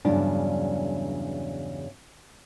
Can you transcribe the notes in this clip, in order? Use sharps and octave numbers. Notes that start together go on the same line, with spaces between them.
E2 G2 C#3 F#3 D4